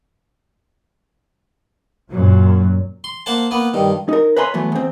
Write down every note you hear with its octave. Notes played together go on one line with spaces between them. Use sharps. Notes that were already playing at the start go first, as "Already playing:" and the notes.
F#2 A#2 F#3
C6
A#3 C5 F#5 A5
A#3 B3 B4
G2 D#3
D#4 A#4
B4 C#5 E5 G#5 A#5 C6
E3 F#3 A3 B3
E2 C4